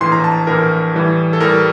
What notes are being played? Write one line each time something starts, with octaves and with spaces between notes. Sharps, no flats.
A#1 A2 E3 C6
A#5
A5
A#1 A2 E3 A#4
A2 E3 G3
A4
A2 E3 G3 A#4